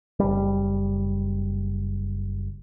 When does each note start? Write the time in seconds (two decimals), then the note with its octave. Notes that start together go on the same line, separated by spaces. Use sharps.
0.20 F#1 G3